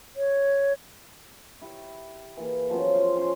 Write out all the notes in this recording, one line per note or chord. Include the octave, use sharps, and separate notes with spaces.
C#5
E4 G4 C#6
E3 A#3 G#4
F3 F#3 B3 C#4
C5 D#5 F5
C#4 C6 C#6